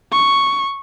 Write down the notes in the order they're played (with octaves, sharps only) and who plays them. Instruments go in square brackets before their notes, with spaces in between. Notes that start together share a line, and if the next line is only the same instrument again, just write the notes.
[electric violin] C#6